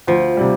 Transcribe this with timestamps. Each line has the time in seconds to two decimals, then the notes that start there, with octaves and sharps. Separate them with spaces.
0.07 D2 F3
0.37 C3 G3